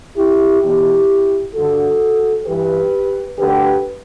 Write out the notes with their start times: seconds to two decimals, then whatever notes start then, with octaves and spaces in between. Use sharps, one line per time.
0.17 E4 G4
0.62 E2 B2 E4 G4
1.54 G2 D3 F#4 A4
2.46 G2 E3 G4 B4
3.37 D2 D3 G4 B4